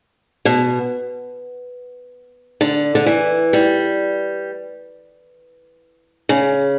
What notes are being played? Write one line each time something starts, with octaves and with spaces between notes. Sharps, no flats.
B2
D3
D3
E3
G3
C#3